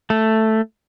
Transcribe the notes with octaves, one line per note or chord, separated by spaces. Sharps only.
A3